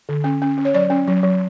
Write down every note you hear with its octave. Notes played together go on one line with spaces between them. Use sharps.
D3
C#4
C#4
C#4
C#5
F#3 D5
C#4
F#3
F#3